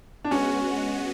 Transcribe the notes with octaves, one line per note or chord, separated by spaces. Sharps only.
D4
G#3 B3 C#4 F#4